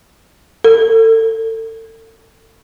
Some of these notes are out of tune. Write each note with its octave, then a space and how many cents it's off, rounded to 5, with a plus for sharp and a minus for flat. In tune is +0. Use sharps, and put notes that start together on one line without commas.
A4 +30